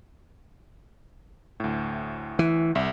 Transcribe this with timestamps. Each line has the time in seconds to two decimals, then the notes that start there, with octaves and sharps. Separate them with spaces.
1.60 D2 A2
2.39 E3
2.75 C2 E5